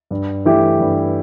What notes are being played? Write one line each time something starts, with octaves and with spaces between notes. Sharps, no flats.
G2
E3 A3 E4 G4
G2